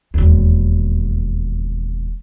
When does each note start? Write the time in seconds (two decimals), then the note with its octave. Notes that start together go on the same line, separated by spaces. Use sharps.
0.14 E1 D#2